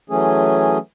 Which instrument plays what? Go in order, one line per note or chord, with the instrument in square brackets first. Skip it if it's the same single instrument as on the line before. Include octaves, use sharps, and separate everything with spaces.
[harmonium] E3 F#3 A3 C#4 G#4